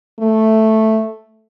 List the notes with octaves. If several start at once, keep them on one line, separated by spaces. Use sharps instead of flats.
A3